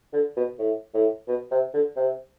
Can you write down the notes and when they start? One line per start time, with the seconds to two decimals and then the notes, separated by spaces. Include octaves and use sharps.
0.13 D3
0.36 B2
0.59 A2
0.94 A2
1.28 B2
1.51 C3
1.74 D3
1.96 C3